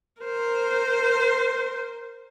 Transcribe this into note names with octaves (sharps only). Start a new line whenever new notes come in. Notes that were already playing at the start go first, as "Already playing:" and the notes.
A#4 C5